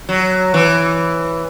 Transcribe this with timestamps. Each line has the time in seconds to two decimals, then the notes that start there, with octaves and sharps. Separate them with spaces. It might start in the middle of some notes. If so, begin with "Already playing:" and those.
0.09 F#3
0.54 E3